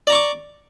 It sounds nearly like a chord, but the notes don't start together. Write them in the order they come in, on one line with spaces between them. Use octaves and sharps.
D5 A#5 C#6 D6